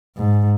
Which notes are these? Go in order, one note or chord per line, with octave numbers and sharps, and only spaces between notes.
G#2